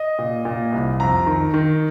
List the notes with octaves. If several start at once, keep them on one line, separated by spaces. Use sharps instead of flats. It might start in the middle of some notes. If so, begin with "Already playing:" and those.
Already playing: D#5
A#2
A#2
C2
F2 A#5
D#3
D#3